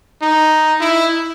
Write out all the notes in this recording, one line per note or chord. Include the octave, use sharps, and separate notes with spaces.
D#4
E4